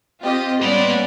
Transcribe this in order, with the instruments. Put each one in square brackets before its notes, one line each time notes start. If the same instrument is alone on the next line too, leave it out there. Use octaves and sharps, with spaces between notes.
[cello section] C4 [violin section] F4 G4 D#5
[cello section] G3 B3 C#4 [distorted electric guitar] A#3 C6 [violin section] B4 D5 F#5